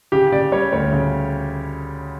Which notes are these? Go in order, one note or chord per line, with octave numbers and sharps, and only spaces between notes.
C#3 G4
C#3 D5
G3 C#5
D2 C#5
C#3